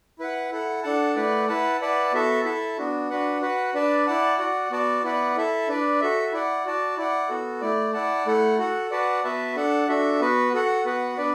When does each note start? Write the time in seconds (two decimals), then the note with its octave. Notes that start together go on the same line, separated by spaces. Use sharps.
0.19 E4 B4 F#5
0.52 E4 A4 F#5
0.83 D4 A4 F#5 A5
1.16 A3 E4 B4 D5 F#5
1.48 E4 B4 F#5 A5
1.80 E4 B4 D5 F#5 A5
2.13 B3 F#4 A4 E5 A5
2.45 E4 A4 E5 A5
2.78 B3 D4 F#4
3.10 D4 F#4 B4 F#5
3.42 F#4 B4 F#5
3.74 D4 B4 D5 A5
4.07 E4 D5 F#5 A5
4.38 F#4 D5 F#5
4.71 B3 F#4 D5 A5
5.03 B3 E4 B4 D5 F#5
5.36 E4 A4 E5 A5
5.68 D4 B4 D5
6.01 F#4 A4 E5
6.32 E4 D5 F#5
6.65 F#4 D5 A5
6.98 E4 D5 F#5
7.29 B3 F#4 A4
7.61 A3 E4 D5
7.94 E4 D5 F#5 A5
8.26 A3 E4 A4 F#5
8.59 F#4 A4 F#5
8.91 F#4 B4 D5 F#5 A5
9.24 B3 F#4 B4 E5 A5
9.56 D4 A4 F#5 A5
9.88 D4 F#4 A4 E5
10.21 B3 F#4 B4
10.53 F#4 A4 F#5
10.85 B3 F#4 B4 F#5
11.17 B3 D4 B4 D5